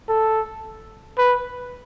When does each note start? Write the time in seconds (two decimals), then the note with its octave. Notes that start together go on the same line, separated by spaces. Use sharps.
0.09 A4
1.18 B4